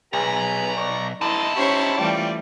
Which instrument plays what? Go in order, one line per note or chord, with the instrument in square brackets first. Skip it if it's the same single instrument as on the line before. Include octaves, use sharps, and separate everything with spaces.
[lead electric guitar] B1 [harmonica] G#4 B4 B5 [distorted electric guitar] A#5
[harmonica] D5 C#6
[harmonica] E3 D#5 C6 [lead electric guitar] D#4 E4 [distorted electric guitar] A5
[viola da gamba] C#4 C5 C#5 [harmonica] G4 B5 C#6
[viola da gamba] E3 G3 A3 [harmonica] F4 D5 G5